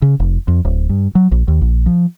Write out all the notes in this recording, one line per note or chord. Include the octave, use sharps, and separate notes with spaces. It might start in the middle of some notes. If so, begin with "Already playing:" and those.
C#3
F1
F2
D1
G2
F#3
A#1
D#2
A#1
F3